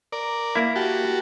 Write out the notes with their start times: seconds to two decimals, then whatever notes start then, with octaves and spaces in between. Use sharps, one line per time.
0.12 A#4 D5
0.55 A#3 E4
0.76 F#4 G4 A5